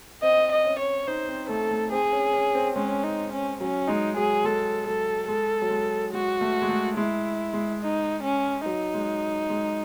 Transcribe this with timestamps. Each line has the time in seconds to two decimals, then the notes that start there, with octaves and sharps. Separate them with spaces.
0.23 C4 D#5
0.52 D#5
0.65 C#4
0.79 C#5
1.08 D#4 C5
1.29 C4
1.49 A3 A4
1.71 A3
1.91 C4 G#4
2.12 C#4
2.33 C#4
2.55 C4
2.76 G#3 C#4
3.03 D#4
3.33 C#4
3.60 F#3 C#4
3.88 G#3 D#4
4.16 F#3 G#4
4.44 G#3 A4
4.86 F#3 A4
5.28 G#3 A4
5.62 F#3
5.70 G#3
6.14 G#3 F#4
6.41 A3
6.62 G#3
6.69 A3
6.97 G#3 E4
7.53 G#3
7.81 D#4
8.23 C#4
8.65 F#3 D#4
8.94 G#3
9.50 G#3